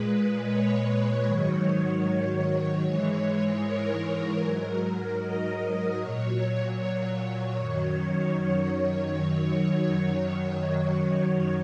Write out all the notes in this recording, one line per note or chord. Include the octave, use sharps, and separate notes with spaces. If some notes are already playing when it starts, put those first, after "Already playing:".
Already playing: A#2 G#3 B4
C#5
G#2 D#3 F#3
G#2 E3 G#3 C#5
A#4
G#2 F#3
D#5
A#2 F#3 C#5
F#2 D#3 F#3